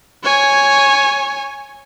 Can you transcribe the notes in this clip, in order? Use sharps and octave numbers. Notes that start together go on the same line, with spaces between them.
C#5 G#5